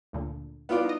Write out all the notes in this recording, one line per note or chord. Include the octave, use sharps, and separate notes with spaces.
D2 A#2 D3
B3 F4 D5
D#4 D#5